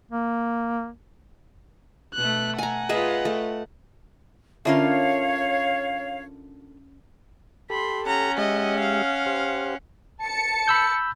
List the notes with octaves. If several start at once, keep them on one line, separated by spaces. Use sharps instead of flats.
A#3
B2 A3 F#6
F#5 G#5 A#5
F4 G#4 B4 D#5 E5
A3
D3 C#4 F4 A#4 C#5 E5 F5
G4 A4 B5 C6
C#4 F#5 A#5
G#3 G4 D#5 E5
F5
G4 C5
A5 C#7
B5 E6 G6